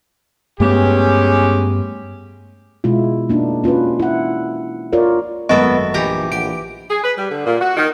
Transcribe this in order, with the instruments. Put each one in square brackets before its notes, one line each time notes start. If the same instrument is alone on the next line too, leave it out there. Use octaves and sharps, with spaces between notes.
[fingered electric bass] G2 A3 B3 [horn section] G#3 C#4 G4
[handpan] B2 G#3 E4 F4
A#3 D4 D#4
C#4 F4 F#4 B4
E4 F#5
F4 A#4 C#5 D5
[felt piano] G#1 F#2 A3 [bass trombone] B3 [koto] F#4 A4 E5 [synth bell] D#5
[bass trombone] A#1 [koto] E3 G4 A#5 [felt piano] B5
[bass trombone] A#1 [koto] G4 [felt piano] F#5 [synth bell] D7
[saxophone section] G#4
B4
G3
D3
A#2
F#4
D#3